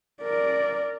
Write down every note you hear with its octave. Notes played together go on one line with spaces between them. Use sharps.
A#4 D5